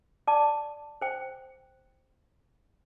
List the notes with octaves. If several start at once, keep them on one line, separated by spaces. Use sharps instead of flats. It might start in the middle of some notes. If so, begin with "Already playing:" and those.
D5 A5 D6
C5 G5